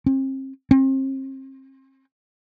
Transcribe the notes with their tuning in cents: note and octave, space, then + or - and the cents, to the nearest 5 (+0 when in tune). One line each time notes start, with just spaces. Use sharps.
C4 +35
C4 +35